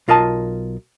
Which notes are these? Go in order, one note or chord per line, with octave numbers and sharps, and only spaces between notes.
B1 F4 A#4 D#5 A5